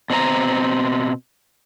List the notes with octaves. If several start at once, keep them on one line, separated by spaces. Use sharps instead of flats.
B2 C4 C#5 A#5